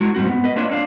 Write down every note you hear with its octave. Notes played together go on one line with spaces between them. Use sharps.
G#3 E4 F#4
G#2 G3 C4 F#4
B3
B4 D#5
A#3 D4 F4 B4 C#5
C4 D4 F5